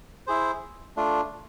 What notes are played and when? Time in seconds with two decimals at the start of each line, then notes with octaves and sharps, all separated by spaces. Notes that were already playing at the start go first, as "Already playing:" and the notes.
0.27 E4 G#4 C5
0.97 A3 D4 F4